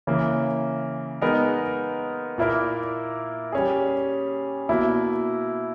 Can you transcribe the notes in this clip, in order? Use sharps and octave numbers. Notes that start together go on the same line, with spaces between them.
C#3 E3 A#3
G#3 B3 D#4 A#4
A#2 A#3 E4 A#4
G3 C#4 G#4
B2 A#3 E4